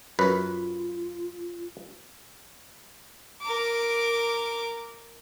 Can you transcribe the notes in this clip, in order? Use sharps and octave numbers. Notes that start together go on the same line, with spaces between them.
F#2 F4 B4
A#4 D6